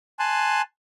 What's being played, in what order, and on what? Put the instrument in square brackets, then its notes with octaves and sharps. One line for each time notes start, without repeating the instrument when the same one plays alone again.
[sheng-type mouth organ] G#5 A5 C6 F#6